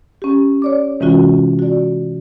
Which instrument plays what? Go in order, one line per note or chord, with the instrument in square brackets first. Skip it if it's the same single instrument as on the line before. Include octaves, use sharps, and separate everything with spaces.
[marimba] C#4 G4
C#5 D5 D6
C3 E3 G#3 C#4 F4 F#4
F#4 D5